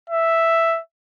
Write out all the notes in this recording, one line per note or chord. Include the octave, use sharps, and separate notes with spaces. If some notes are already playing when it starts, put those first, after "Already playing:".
E5